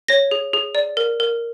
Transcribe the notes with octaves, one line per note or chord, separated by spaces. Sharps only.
C#5 A#6
G#4
G#4
D5
A#4
A#4